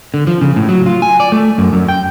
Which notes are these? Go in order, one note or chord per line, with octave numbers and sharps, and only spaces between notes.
D3
F3
C#3
A2
F#3
F4
G#5
D5
A3
F#2
F#2
G5